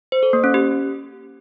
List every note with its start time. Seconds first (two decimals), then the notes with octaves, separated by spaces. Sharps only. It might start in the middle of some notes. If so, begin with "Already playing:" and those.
0.12 C5
0.23 A4
0.33 A#3
0.44 C#4
0.54 G4